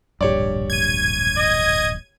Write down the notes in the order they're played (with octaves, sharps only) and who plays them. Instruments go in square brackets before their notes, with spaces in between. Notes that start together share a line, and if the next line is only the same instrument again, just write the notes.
[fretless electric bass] D1 A#1 G2 [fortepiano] G4 C#5 D5
[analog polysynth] G#6 D#7
[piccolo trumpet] D#5